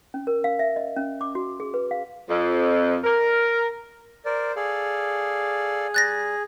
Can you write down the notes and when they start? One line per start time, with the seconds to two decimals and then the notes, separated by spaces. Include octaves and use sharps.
0.14 C#4
0.27 A#4
0.44 F5
0.59 E5
0.76 D#5
0.97 C#4
1.21 D6
1.35 F#4
1.60 G#4
1.74 B4
1.91 F5
2.29 F2
3.04 A#4
4.26 A#4 C5 D5
4.56 G#4 A4 D5 F5
5.94 G3 F#6 A6 A#6